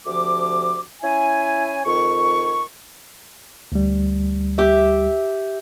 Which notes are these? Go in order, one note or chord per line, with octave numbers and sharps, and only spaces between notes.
D2 C3 F3 D6
C#4 E4 G#5
F2 D#3 C#6
D2 G3
G4 E5